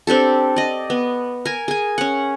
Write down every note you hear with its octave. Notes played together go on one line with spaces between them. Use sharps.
C4 D4 G4 A4
D5 D#5
B3
A#4 G#5
G#4 G#5
C#4 F#5